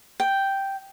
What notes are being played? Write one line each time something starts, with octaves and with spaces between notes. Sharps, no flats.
G5